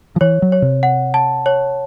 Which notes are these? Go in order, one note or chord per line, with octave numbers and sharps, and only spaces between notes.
F3
E3 C#5
F#3
C#5
C3
F#5
A5
C#5